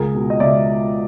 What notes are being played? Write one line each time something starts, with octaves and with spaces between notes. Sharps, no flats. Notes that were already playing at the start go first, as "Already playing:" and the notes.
Already playing: C#2 G#4 A#4
B2
D#5
C#2 D5 E5